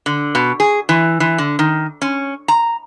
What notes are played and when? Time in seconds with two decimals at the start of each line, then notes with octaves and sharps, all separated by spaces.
0.06 D3
0.35 B2
0.60 G#4
0.89 E3
1.20 E3
1.38 D3
1.59 D#3
2.02 C#4
2.48 A#5